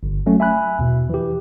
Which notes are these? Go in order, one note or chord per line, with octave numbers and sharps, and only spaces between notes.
G1
F#3 A3 C#4
E5 G#5 B5 F#6
E2 B2
E3 G4